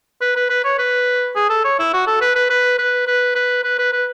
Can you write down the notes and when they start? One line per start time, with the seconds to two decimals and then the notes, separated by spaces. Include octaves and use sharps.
0.21 B4
0.36 B4
0.50 B4
0.65 C#5
0.79 B4
1.36 G#4
1.50 A4
1.65 C#5
1.79 E4
1.93 F#4
2.07 A4
2.21 B4
2.36 B4
2.50 B4
2.79 B4
3.07 B4
3.35 B4
3.64 B4
3.78 B4
3.93 B4